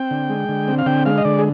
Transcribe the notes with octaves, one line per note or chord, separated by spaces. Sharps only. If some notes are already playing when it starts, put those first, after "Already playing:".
Already playing: C4 G5
D3
G#3
D3
C4
F5
D3 G5
G#3 F5
D#5
D3 D5
G#4